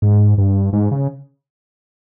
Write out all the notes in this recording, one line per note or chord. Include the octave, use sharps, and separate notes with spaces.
G#2
G2
G#2
C#3